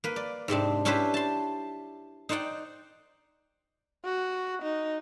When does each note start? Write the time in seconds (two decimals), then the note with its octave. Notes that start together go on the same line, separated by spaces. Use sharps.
0.04 A#3 B4
0.16 D5
0.48 G#2 C3 C4 D4
0.85 C#4 D4 E4 G4 B4 C5
1.14 A5 C6
2.29 D#4 C5 D5 F#5 G5
4.05 F#4
4.63 D#4